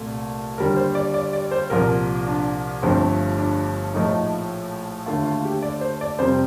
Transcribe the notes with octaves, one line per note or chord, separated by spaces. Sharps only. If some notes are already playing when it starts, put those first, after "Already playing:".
Already playing: C2 A#2 A3
D#2 D3 G3 A#4
C5
D5
D5
D5
C5
C2 A#2 F3 A#4
D4
G1 G2 F3 A3 C4
D4
A#1 A2 F3 A3 D#4
D#2 D3 A3 F4
F4
G4
D5
C5
D5
F2 C3 G3 C5